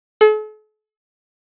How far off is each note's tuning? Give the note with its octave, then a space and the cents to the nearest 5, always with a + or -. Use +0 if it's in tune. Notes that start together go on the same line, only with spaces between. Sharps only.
A4 -45